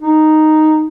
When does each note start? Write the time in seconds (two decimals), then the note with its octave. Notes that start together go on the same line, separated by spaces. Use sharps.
0.01 D#4